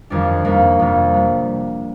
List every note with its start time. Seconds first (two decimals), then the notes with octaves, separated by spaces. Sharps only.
0.10 F2 D#3 G3 D4
0.45 F2 C3 G3 A#3
0.79 F2 C3 G3 A#3
1.14 C3 G3